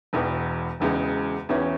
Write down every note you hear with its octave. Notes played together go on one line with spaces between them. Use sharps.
E1 E2 B2
E1 E2 C#3 G#3
E1 E2 E3 C#4